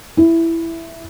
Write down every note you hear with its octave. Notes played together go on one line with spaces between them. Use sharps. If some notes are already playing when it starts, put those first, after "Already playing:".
E4